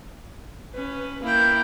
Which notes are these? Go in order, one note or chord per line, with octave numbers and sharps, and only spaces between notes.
C#4 B4
A#3 E4 G5